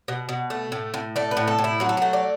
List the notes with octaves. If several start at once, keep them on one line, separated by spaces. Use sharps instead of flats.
B2
B2
A3
A2
A2
A3 D5
B4
A2
A4
A2
E4
F#3 F#4
A4
A3 F#4
D5